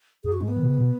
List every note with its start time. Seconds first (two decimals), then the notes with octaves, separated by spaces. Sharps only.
0.24 F#2 G#4
0.32 F#4
0.41 G#2 G#3
0.48 B3
0.56 D#3
0.63 B2
0.68 C#3
0.79 B2